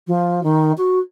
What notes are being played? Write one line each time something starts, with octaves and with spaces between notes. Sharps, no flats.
F3
D#3
F#4